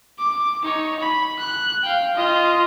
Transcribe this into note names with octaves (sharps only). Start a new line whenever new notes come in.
D6
D#4 C#5
B5
F#6
F5 G5
F4 D#5